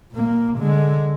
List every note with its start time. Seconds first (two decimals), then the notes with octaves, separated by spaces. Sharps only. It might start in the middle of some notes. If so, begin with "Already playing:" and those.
0.12 A#2 A#3
0.58 D3 G#3